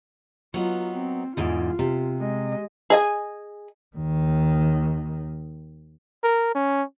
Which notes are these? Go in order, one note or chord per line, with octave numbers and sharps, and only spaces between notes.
F#3 B3 D#4 F4
C4
E2 G#2 D3 F4
C3
G#3 D#5
G#4 D#5 G#5
D#2 D#3
A#4
C#4